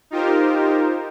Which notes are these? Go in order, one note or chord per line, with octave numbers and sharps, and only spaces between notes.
D#4 F4 G4 A#4 C5